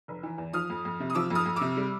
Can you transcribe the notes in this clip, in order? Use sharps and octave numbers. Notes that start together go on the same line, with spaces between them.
F1
E3
E2
F3 D#6 F6
F2
F2
C3
D#6
F3 D6 E6
F2 D#6 F6
F2
C3 D6 E6
G3